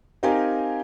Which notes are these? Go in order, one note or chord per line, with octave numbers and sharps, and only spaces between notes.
C4 D#4 G4 A#4 F5 G#5